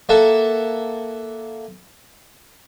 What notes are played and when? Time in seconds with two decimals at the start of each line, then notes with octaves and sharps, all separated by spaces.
0.09 A#3 E4 A4 E5 F#5